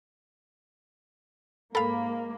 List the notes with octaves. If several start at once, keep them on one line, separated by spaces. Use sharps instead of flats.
G#2 A#3 A4 F5 B5